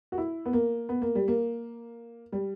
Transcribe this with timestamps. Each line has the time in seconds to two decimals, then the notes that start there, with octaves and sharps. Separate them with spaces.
0.12 F#4
0.18 E4
0.46 B3
0.53 A#3
0.89 B3
1.02 A#3
1.15 G3
1.28 A#3
2.32 G3